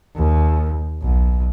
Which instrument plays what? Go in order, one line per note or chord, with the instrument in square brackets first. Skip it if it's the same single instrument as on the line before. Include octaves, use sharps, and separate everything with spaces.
[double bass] D#2
B1